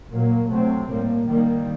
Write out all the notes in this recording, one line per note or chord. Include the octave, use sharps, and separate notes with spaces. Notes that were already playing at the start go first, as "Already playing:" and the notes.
A#2 F#3 A#3
C3 F#3 A3 C4
A2 G3 A#3
D#3 G3 A#3